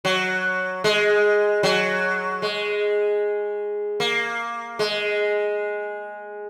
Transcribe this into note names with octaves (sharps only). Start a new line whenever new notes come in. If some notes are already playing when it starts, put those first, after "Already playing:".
F#3
G#3
F#3
G#3
A#3
G#3